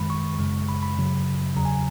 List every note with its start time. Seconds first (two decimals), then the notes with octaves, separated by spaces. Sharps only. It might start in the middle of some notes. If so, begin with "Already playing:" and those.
Already playing: F#2 D#3 G#3 B5
0.10 C#6
0.39 F#2 C#3 G#3
0.69 B5
0.83 B5
0.97 F#2 C#3 F#3
1.56 E2 C#3 F#3 A#5
1.65 G#5